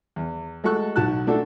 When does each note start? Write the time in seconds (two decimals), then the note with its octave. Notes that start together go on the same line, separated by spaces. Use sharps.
0.16 E2
0.64 G#3 A3 F#4 A4 C#6 F#6
0.96 B1 F#4 A5 F#6
1.27 A3 D4 F#4 A4